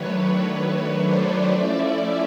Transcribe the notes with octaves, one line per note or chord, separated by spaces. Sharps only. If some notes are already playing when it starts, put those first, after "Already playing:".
Already playing: D#3 F#3 A3 D4 B4 C#5
B4 C#5
C5 D5
F3 A3 C#4 E4 D5 E5